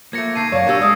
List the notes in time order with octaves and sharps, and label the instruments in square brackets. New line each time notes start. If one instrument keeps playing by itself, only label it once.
[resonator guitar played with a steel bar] F3 A3 [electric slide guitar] A#3 [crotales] G#6 A#6 C#7
[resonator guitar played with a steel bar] C3 D#3 [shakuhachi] A5 [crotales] G#6 C7 D#7
[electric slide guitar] F#2 A#3 [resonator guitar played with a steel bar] C#5 D5 [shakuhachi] F5 [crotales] C#6
[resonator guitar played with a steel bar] B2 D4 G4 [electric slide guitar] A#4 [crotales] E6 G#6 D#7
[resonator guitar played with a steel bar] G3 B4 F5 [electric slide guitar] G#3 [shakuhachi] D#6